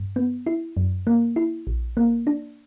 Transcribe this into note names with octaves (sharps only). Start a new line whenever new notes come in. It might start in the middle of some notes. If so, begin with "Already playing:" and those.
Already playing: G2
B3
E4
F#2
A#3
E4
A#1
A#3
D4